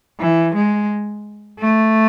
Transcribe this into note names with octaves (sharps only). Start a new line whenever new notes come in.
E3
G#3
A3